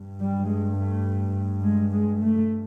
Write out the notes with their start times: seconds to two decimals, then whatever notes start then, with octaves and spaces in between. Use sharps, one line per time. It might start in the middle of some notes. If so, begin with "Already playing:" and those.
Already playing: G2
0.20 G3
0.48 G#3
0.76 A3
1.62 G#3
1.91 G#3
2.21 A3